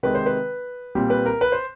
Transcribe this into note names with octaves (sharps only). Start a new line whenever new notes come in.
C3 D#3 G#3 C4 B4
C5
B4
A#2 G3 C4
B4
A#4
B4
C5